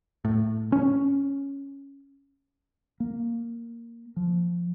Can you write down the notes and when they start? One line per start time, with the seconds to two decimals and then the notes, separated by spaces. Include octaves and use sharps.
0.25 A2
0.72 C#4
3.00 A#3
4.16 F3